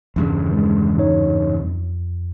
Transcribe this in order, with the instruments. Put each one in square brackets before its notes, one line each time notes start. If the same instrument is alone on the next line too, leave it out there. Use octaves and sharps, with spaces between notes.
[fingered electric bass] E2 G2 C#3
[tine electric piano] D#3 E3 G#3
G#2 D#4 C#5
F2